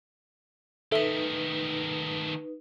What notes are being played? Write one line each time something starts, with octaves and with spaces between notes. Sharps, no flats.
D#3 A3 D#4 A4 B4 E5